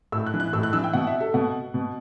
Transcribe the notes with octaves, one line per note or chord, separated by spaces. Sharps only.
A2 E6
F#6
E3
F#6
A2 E6
F#6
E3 E6
G5
B2 F#5
E5
A4
B2 F#5
B2